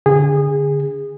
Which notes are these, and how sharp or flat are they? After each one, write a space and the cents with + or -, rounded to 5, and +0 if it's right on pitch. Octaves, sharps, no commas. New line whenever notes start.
D3 -20 G#4 -20